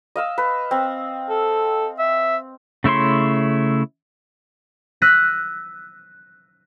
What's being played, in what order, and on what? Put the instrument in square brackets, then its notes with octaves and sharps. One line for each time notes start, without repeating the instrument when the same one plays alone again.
[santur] D#5 F5 E6
B4
C4
[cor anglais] A4
E5
[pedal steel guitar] C#3 A3 E4 C#5 C6
[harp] E6 F#6 A#6 B6 D#7